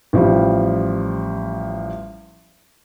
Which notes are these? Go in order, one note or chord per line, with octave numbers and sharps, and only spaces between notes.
A1 F3 G3